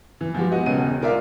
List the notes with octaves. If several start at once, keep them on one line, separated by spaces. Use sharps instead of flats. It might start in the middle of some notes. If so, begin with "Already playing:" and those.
E3
F3 G#3 F#4 G4
B3 F#4 D#5 F#5 G#5
E1 E2 C#3 G#4 D#7
D#4 F4 A#4 D5 E5 F5